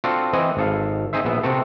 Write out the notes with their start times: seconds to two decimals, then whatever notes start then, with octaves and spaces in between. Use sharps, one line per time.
0.04 C4 D4 F4 F#4 A4
0.33 E3 C4 D#5 F#5 G#5
0.57 G#1 A4 F5
1.13 C4 D#4 G#4 C5 E5
1.25 A#1 B3 E5
1.43 C3 C4 F#4 A4